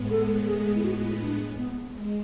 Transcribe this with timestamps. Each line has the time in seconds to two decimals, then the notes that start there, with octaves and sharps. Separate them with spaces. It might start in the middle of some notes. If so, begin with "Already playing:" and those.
Already playing: A2 G#3 B3
0.10 A4
0.47 G#4
0.66 G#4
0.75 E4
0.84 F#4
1.03 E4
1.21 D4
1.57 B3
1.94 G#3